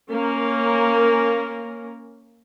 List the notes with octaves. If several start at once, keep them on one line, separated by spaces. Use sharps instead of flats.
A#3 C#4 A#4